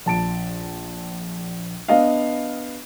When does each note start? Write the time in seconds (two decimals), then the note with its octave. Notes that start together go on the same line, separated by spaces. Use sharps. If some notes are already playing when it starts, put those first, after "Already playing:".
0.06 A#1 A5 D7
1.88 B3 D4 D#5 F5